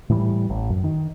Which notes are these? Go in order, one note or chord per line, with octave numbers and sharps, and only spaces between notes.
A2 E3 G3
A1
F#2
D#3